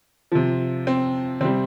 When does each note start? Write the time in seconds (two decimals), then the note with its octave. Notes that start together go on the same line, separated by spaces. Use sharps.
0.32 C3 F3
0.87 C4
1.41 C3 G3 C4